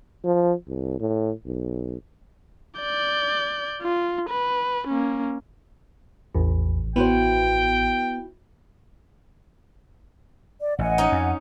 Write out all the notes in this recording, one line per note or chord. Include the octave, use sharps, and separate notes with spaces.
F3
C2
A2
B1
D5 G6
F4
B4
A#3 C#4
A1 E2
B3 E4 F#4 C5 G5
D5
A1 D#5 F#5 G#5
C#4 D#4
F2